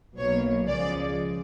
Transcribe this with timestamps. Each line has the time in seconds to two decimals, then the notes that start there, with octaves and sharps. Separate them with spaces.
0.17 B1 B2 F#3 A#3 C#5
0.68 C#2 C#3 F3 G#3 D5